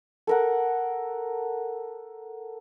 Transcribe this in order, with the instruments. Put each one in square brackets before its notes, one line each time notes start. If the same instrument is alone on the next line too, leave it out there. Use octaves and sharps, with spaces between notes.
[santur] A4 A#4 F#5